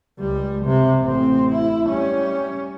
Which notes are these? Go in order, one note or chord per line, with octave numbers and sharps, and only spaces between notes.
C#2 G3
C3
A1 C4
E4
G3 C#4